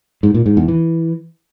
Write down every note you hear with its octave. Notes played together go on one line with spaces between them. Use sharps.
G#2
A#2
G#2
E2
E3